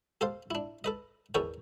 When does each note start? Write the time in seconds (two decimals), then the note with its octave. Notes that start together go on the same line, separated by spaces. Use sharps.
0.21 G4 A4 C5 F5
0.51 D4 E4
0.84 A4 B4 D#5
1.34 E2 E3 A4 A#4 C#5 G5